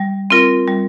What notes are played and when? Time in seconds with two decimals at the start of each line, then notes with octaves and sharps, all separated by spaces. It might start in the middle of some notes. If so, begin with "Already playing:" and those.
Already playing: G3
0.30 C4 F4 A#4
0.68 G3